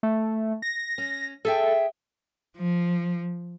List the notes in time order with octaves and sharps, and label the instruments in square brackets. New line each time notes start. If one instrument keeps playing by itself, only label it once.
[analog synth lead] A3
A#6
[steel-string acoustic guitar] C#4
[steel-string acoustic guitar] G#4 E5 G5 [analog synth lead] A4
[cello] F3